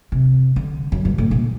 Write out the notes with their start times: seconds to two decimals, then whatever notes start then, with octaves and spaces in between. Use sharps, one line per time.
0.12 C3
0.56 D3
0.92 F#2
1.05 G2
1.18 A2
1.31 A#2